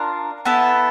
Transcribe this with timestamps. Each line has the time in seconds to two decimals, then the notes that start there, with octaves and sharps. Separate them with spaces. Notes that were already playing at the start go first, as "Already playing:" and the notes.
Already playing: D4 F4 A#4
0.45 B3 E4 A4